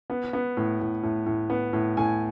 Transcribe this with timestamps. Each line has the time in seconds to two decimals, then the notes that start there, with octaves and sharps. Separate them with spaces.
0.10 B3
0.33 B3
0.57 A2
0.80 A2
1.03 A2
1.26 A2
1.50 B3
1.73 A2
1.97 A2 G#5